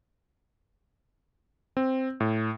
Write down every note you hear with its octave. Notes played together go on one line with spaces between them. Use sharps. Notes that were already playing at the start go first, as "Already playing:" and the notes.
C4
A2